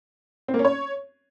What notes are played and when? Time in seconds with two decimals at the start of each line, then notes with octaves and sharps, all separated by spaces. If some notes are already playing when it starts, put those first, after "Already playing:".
0.48 C4
0.54 A#3
0.59 C#4
0.65 C#5